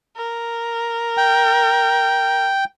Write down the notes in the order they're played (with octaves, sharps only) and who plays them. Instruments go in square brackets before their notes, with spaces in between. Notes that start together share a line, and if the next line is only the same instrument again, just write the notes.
[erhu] A#4
[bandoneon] G5